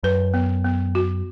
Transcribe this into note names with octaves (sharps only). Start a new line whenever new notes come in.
F#2 B4
B3
B3
F#4